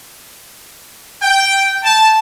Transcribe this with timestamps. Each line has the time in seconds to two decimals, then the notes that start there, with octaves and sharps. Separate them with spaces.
1.21 G5
1.84 A5